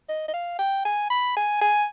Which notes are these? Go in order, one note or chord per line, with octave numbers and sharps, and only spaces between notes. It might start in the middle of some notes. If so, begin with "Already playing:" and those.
D#5
D#5
F5
G5
G#5
B5
G#5
G#5